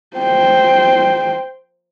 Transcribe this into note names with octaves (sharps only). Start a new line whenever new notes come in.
C5 G5